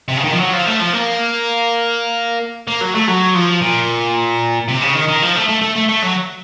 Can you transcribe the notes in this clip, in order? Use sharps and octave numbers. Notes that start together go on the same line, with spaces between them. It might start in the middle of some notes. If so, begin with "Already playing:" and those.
C3
C#3
D#3
F3
F#3
F3
A3
F3
A#3
A#3
F#3
A3
F#3
F3
A#2
C3
C#3
D#3
D#3
F3
A3
A3
A3
A3
A3
F#3